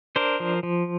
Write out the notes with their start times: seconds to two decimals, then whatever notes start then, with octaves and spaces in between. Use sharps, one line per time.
0.16 D4 A#4 C5
0.40 F3
0.63 F3